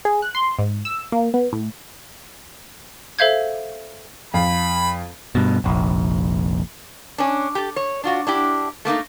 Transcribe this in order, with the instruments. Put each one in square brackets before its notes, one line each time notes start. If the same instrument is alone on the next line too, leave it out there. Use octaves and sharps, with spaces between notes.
[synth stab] G#4
F#6
C6
G#2
E6
A#3
B3
A2
[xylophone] A4 C5 E5 F5 G6 G#6
[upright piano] F2 F5 [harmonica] B5
[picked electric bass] G2 B2
F1 A#1
[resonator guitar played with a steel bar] C#4 D4
G4 A4
C#5
D4 F4 F#4
D4 E4 G4
A3 A#3 C#4 D#4